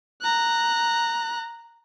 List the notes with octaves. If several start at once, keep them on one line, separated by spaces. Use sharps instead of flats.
A#5 F#6